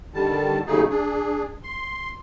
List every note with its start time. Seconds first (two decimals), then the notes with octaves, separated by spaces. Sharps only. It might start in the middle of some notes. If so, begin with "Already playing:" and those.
0.14 D3 D#3 G3 A5
0.67 D#2 C#3 F#3 A3 D#4 G#4
0.90 D4 G#4
1.63 C6